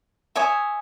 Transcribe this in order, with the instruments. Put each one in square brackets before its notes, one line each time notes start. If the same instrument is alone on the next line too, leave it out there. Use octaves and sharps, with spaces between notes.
[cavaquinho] C#5 E5 G#5 D#6